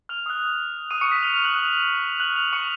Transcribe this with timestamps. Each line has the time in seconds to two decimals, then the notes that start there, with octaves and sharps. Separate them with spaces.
0.09 F6 F7
0.26 D#6 F#6
0.91 D#6 D#7
1.01 C#6 C#7
1.12 B6
1.23 F6 F7
1.34 F6 F7
1.44 F#6 F#7
1.55 D#6 F#6 F#7
2.20 F#6 F#7
2.36 F6 F7
2.52 C#6 C#7